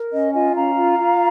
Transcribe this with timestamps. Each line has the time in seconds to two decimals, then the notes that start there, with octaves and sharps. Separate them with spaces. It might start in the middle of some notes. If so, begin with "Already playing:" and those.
Already playing: A#4
0.12 C#4 D#5
0.33 F4 D#5 G#5
0.55 C#4 F5 A#5
0.77 F4
0.98 F4